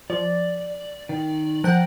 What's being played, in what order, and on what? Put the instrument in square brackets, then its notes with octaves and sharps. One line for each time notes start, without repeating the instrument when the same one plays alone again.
[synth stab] F3 [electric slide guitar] D5
[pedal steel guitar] D#3
[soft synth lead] F3 [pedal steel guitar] A#4 G5 [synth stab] F#5 F#6